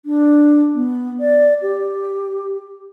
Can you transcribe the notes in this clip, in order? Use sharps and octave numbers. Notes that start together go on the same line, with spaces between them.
D4
B3
D5
G4